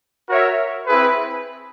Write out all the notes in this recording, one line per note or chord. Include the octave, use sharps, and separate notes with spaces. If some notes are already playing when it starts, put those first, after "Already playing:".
F#4 A#4 C#5 E5
C4 E4 G#4 B4